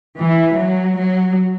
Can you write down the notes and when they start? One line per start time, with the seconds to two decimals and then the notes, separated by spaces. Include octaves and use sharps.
0.20 E3
0.60 F#3
1.00 F#3